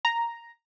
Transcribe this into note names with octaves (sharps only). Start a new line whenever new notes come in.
A#5